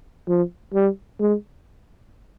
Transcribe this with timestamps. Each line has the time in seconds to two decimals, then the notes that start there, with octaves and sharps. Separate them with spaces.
0.28 F3
0.74 G3
1.20 G#3